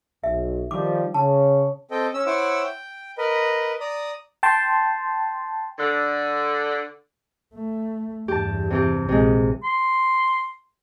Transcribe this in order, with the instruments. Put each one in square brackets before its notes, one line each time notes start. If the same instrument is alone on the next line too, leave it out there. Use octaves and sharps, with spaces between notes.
[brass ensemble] B1 [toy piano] E5
[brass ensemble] D#3 F3 G3 [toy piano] D6
[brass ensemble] C#3 C#5 [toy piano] A5
[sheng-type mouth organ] C4 A4 D#5 G5
C#4 E6
E4 C5 C#5 F#5 D6 E6
G5
A#4 B4 D#5
D5 A#5 D#6
[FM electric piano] G5 A5 C6
[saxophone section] D3
[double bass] A3
[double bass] E2 G2 [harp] G4 A5
[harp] C3 E3 G4
[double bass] A#1 [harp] C3 G#3
[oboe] C6